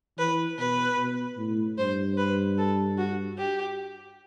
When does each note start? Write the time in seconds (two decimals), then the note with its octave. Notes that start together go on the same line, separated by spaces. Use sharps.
0.18 E3 B4
0.58 B2 B4
0.98 B2
1.37 A2
1.78 G2 C5
2.17 B4
2.57 A4
2.98 F#4
3.37 G4